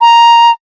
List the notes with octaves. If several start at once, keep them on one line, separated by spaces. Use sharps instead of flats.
A#5